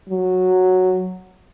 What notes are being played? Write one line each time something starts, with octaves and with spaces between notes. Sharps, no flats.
F#3